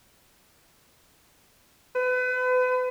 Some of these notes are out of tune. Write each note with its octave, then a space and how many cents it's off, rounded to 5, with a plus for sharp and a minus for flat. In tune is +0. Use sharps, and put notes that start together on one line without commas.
B4 +35